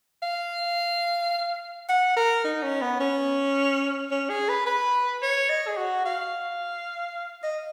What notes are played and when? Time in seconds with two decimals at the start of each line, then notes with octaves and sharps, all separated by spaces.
0.23 F5
1.89 F#5
2.17 A#4
2.44 D#4
2.63 C#4
2.82 B3
3.00 C#4
4.11 C#4
4.30 G#4
4.49 B4
4.66 B4
5.22 C#5
5.50 D#5
5.67 G#4
5.77 F#4
6.06 F5
7.44 D#5